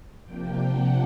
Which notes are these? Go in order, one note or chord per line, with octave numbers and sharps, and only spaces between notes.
C3 F3 A#3 D4 G5
F#5